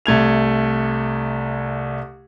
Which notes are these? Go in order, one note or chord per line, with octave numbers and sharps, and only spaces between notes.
C2 A3 G#6 F7